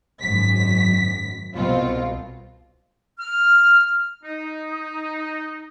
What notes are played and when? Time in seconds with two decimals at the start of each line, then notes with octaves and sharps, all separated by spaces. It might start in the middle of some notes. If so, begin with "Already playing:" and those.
0.22 G#1 F#2 B6
1.56 C2 B2 C4 F4
3.20 F6
4.24 D#4